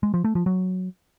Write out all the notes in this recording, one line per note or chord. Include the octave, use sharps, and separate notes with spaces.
G#3
F3
A3
F3
F#3